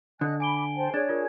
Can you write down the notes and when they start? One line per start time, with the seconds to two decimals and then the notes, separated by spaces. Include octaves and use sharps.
0.21 D3 D#5 G#5 D#6 F#6
0.40 G#5 B5 D6 D7 G7
0.75 C5 G5 A5
0.94 D4 G#4 C#5 G#6 A6
1.09 F4 A#4